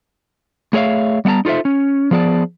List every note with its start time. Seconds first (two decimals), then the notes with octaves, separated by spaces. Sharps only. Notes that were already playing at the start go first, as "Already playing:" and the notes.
0.73 A3 G#4 C#5 E5 F5
1.25 G3 B3 F#5 A5 A#5
1.45 D#4 F4 A4 C5 E5
1.65 C#4
2.11 F3 B3 G#4 D5 A5